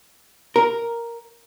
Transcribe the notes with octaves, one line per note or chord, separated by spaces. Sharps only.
A#4